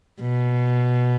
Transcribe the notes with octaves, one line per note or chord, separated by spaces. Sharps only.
B2